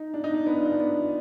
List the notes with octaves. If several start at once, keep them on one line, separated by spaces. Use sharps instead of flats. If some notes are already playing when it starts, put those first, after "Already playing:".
Already playing: D#4
D4
D#4
D4
B3
F4
D#4
D4
B3